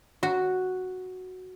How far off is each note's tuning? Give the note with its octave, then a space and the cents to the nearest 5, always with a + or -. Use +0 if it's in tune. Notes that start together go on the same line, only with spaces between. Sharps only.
F#4 +0